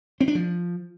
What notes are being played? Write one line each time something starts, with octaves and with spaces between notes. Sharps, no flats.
C4
D4
F3